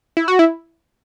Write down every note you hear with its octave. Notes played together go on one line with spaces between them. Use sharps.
E4
F#4
E4